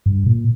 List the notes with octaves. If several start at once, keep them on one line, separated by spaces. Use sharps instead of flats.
G2
A#2